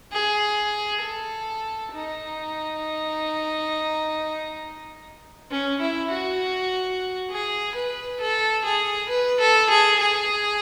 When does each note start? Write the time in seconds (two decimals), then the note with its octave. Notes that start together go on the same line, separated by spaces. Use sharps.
0.13 G#4
1.03 A4
1.93 D#4
5.51 C#4
5.81 E4
6.11 F#4
7.31 G#4
7.76 B4
8.21 A4
8.65 G#4
9.10 B4
9.41 A4
9.70 G#4
10.00 G#4